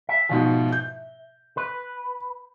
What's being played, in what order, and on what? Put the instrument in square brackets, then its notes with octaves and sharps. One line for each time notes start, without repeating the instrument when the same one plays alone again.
[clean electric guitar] E5
[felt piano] G#2 B2 F3
G6
[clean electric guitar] B4